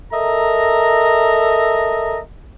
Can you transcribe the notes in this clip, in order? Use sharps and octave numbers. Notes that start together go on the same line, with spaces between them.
A4 A#4 D#5 E5 A#5